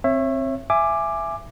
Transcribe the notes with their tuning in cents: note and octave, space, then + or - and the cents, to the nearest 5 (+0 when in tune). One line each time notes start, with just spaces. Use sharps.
C4 +10 C#5 -25 E5 +15
E5 +15 G#5 +0 D6 +10